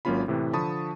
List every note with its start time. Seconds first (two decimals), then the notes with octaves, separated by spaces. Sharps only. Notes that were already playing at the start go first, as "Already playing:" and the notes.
0.05 G#1 F#3 A#3 C#4 F4 B5
0.28 A2 C3 E3
0.53 D3 F3 A5 B5 C#6 D#6